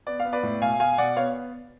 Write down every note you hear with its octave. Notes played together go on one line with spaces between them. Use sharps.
B3 D5
F5
B3
B4 D5
A2
B2 F5 G#5
B2 F5 G#5
B2 D5 F#5
B3 C#5 F5